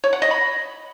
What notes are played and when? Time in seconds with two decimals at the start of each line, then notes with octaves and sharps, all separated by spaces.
0.04 C#5
0.13 F#5
0.22 D#5
0.31 B5